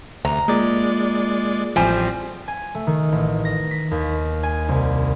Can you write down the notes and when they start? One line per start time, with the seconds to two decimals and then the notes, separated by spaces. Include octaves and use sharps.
0.25 D2 A#5
0.48 G#3 A#3 F4 D5
1.76 A1 F3 G3 C4 G#5
2.48 G#5
2.75 A3
2.87 D#3
3.12 A1
3.45 A#6
3.71 B6
3.91 D#2
4.43 G#5
4.68 C2